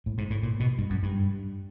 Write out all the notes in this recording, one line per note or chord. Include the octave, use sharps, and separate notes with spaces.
A2
G#2
A2
A#2
B2
G2
F#2
G2